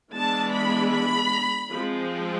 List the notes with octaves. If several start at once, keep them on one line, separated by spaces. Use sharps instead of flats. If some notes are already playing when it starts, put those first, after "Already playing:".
E3 G#3 B3 D4 A5
B5
B5
F3 G#3 C4